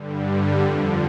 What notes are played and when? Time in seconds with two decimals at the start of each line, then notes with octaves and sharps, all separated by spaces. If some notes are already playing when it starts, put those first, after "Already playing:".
Already playing: G2 D3 G3
0.62 F2 D3 F3